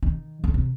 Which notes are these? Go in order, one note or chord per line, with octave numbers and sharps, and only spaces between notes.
D#3
D3
C3